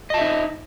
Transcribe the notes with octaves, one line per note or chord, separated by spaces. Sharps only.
D#4 D#5 E5 A5